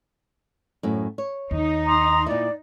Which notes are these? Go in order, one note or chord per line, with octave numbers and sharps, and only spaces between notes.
F#2 A2 C4
C#5
D#2 D#4
A#5 C6 D#6
A#2 E4 D5